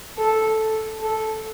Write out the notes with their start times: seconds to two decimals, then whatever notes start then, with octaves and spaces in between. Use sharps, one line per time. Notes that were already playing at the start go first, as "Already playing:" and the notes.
0.18 A4
1.02 A4